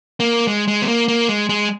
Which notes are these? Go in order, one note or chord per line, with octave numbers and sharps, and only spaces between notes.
A#3
G#3
G#3
B3
A#3
A#3
G#3
G#3